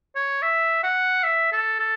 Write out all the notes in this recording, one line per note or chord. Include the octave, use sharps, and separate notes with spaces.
C#5
E5
F#5
E5
A4
A4